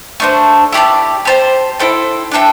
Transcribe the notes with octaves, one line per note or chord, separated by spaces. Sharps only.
A3 D4 C5
E4 G4 D5 A5
G4 C5 A5
E4 A4 C5 G5
D4 A4 E5 G5